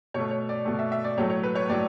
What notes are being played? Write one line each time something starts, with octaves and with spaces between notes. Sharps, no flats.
B2 A3 C#5
C#5
D5
B2 A3
E5
E5
D5
A2 F#3 A3 C#5
C#5
B4
C#5
A2 F#3 D5